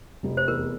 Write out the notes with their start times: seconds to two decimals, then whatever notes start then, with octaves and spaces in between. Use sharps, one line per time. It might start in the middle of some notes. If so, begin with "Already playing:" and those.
0.23 F1
0.37 C5
0.47 E2 A#4